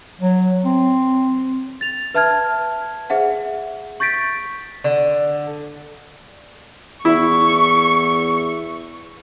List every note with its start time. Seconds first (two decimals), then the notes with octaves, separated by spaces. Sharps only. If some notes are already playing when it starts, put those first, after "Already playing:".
0.21 F#3
0.65 C4
1.81 A6 F7
2.14 B4 E5 A5 F6 G#6
3.10 G#4 C5 E5 F#5
4.00 C#6 G6 A6 B6 D7
4.84 D3
7.05 E2 E4 C#6